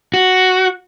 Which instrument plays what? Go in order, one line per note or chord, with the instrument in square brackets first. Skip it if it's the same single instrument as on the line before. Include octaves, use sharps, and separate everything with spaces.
[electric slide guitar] F#4